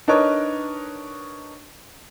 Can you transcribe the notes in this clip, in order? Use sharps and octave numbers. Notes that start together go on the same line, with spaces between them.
D4 D#4 A#4 B4 C#5 D#5